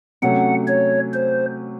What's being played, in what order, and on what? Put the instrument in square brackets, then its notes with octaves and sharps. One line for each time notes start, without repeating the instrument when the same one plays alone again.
[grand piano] C3 F#3 A3 C#4 [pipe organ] F#5
[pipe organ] C#5
C5